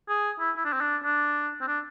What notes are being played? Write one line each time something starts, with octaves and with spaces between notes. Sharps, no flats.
G#4
E4
E4
D4
C4
D4
D4
C4
D4